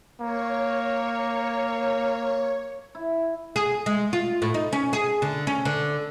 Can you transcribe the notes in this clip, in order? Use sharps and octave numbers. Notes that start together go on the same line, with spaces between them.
A#3 C#5
E4
G#4
G#3
F4
A2
D#4
C#4
G#4
D3
C#4
D3